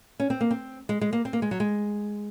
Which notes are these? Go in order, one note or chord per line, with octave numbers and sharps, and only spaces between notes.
C#4
C4
A#3
C4
G#3
G#3
A#3
C4
A#3
G#3
F#3
G#3